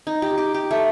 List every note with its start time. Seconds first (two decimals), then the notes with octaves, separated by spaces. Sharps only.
0.07 D#4
0.22 G4
0.38 G4
0.54 G4
0.71 A3